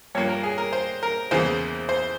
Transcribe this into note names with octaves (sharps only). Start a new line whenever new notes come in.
G2 F3 A#3 C#5
A#4
G#4
A#4
C5
A#4
E2 C#3 E3 A#3 C5
C5